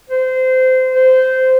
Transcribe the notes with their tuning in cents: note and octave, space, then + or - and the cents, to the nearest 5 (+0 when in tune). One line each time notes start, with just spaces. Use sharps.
C5 -25
C5 -15